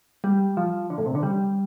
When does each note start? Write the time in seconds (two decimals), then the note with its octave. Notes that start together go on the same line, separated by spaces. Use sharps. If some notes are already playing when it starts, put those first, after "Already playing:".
0.24 G3
0.57 F3
0.90 D3
0.98 A2
1.06 C3
1.15 D3
1.23 G3